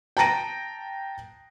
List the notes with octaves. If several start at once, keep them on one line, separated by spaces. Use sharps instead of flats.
G5 A5 A#5 A#6 D7 D#7